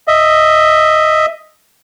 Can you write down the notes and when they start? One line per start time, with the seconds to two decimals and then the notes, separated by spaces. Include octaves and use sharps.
0.08 D#5 E5